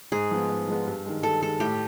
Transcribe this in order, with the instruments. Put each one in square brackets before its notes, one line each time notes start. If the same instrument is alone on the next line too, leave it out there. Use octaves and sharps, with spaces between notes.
[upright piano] G#2 [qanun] G#4
[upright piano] F3 G#3 B3
G#2
F3 G#3 B3
G2
D#3 G#3
[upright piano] G2 [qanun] A4
[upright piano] D#3 G#3 [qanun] A4
[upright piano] A2 [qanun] G4